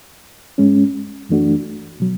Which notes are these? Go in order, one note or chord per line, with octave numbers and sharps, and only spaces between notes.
G#2 G#3 C#4
F#2 E3 A3 D4 F#4
B2 F#3